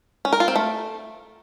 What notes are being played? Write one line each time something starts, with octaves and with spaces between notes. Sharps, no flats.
C#4
A#4
F4
C4
A3